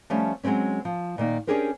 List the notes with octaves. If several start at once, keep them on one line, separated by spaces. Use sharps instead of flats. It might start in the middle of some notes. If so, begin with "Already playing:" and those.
F3 G3 A3 C#4
F#3 G#3 A3 C4 C#4
F3
A#2 D#3 A#3
C#4 D4 G4 G#4 A#4 C5